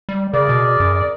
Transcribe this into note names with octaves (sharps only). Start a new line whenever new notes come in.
G3
C#3 G#4 A#4 D5
B2
F#2